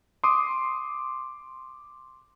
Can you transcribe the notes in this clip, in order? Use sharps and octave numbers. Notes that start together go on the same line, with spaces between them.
C6 D6 D#6